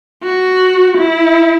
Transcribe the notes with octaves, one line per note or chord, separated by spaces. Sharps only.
F#4
E4